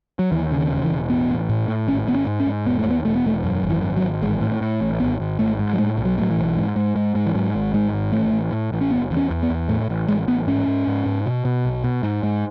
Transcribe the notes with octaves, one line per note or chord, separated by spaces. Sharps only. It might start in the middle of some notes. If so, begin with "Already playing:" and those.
F#3
D#2 E3
C#3
D#3
E1
E3
E1
A1 B3
A1
A2
A2
G#1 C#4
G#1 B3
C#4
G#2
C#4
G#2
E1 B3
A3
D#2 B3
E1 A3
B3
E1 A3
F#2
G#1
E3
G#1
F#3
G#1
A1 G#3
A2
A2
A1
G#1 B3
G#1
G#1 A3
G#2
F#3
A2 G#3
B1
F#3
A2 F#3
E3
B1
G#2
G#2
G#2
G#2
E3
G#2 F#3
G#1
G#2 G#3
G#1
A1 A3
A1
A2
A1
C#4
F#1 B3
E2
C#4
E2
B3
E2
A2 A3
A1
A1 G#3
A1 B3
G#2 C#4
G#2
G#2
G#2
B2
B2
B1
B2
G#2
G#2